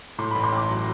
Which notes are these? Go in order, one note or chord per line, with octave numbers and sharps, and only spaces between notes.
A2 C6
A1 B5
C6
A1 D6
F#3